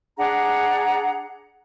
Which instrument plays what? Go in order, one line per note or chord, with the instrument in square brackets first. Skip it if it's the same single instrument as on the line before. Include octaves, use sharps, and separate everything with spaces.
[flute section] D4 G#4 F#5 A#5